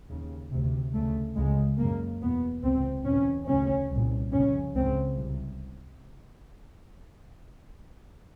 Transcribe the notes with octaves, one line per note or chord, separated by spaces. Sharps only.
D#2 C#3
D2 C3
D2 C#3 A3
C#2 C#3 G#3
F#2 C#3 A#3
E2 B2 B3
C#2 C3 C4
E2 B2 C#4
D2 C#3 C#4
C2 A#2
F2 C#3 C#4
C#2 C#3 C4
C2 C3